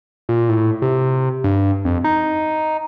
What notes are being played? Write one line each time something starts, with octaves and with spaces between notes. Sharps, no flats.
A#2
A2
C3
G2
F2
D#4